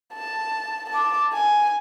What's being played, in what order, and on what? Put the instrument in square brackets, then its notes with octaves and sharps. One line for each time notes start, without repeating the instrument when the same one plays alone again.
[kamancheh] A5
A5 D6
G#5